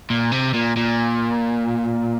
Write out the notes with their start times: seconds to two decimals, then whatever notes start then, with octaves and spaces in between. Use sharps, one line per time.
0.10 A#2
0.32 C3
0.54 A#2
0.77 A#2